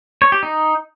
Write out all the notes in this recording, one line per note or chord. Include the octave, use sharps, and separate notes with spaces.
C#5
G4
D#4